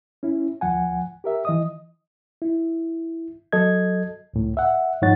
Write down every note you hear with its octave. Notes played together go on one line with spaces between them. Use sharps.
C#4 E4
D2 F3 F#5 G#5
G4 A#4 E5
E3 D#5 D#6
E4
F#3 A4 D#5 G#6
C#2 A2
E5 F#5
G#2 F3 D#4 C#5 F#5 A6